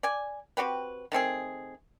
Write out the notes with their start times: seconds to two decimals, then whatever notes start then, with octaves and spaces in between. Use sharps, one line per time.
0.03 D5 G#5
0.57 C4 F#4 G4 B4
1.12 D#3 A3 C4 G#4